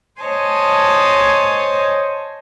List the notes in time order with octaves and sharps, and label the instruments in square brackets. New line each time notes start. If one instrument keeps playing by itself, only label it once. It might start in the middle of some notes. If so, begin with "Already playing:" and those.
[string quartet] C5 C#5 D#5 G#5 A5